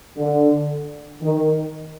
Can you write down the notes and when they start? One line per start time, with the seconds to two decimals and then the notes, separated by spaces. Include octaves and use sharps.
0.17 D3
1.22 D#3